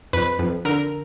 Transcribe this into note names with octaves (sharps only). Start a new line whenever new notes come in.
F2 B4
F2
D3 A#4